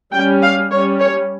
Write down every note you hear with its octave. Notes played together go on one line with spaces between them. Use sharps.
G3 C#4 G5
F5
G3 C#4 C#5
C#5